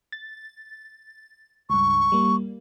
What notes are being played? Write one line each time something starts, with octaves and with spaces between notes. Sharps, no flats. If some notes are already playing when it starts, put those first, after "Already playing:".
A6
C#2 G2 C#6
G3 A#3